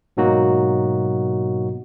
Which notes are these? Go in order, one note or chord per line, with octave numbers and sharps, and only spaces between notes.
G#2 B2 F#3 A#3 D#4 F#4